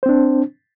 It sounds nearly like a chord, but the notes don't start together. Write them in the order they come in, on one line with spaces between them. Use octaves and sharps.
C5 C4 D4